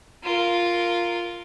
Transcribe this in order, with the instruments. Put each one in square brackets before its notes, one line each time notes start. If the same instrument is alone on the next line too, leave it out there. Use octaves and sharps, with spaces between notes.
[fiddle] F4 A#4